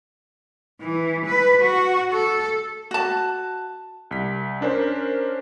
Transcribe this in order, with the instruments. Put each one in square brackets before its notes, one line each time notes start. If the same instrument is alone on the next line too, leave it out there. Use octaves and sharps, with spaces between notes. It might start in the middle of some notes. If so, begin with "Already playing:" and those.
[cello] E3
B4
F#4
A4
[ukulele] F#4 A5
[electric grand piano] C2 B6
C#4 D4 A#4 C5